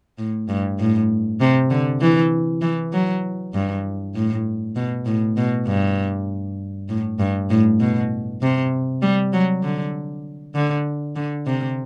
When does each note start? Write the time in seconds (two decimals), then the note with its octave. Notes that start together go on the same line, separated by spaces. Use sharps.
0.18 A2
0.49 G2
0.79 A2
1.41 C3
1.71 D3
2.01 E3
2.62 E3
2.93 F#3
3.54 G2
4.15 A2
4.76 B2
5.06 A2
5.37 B2
5.67 G2
6.89 A2
7.20 G2
7.50 A2
7.80 B2
8.42 C3
9.02 G3
9.33 F#3
9.63 D3
10.55 D3
11.16 D3
11.47 C3